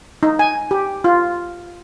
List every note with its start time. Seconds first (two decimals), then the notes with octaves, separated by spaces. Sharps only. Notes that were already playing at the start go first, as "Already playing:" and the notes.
0.23 D#4
0.39 G#5
0.71 G4
1.04 F4